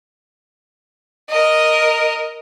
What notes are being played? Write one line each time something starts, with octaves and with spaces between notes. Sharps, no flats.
A#4 D#5